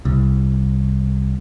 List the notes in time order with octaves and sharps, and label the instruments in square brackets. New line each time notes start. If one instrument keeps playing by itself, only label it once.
[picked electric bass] C2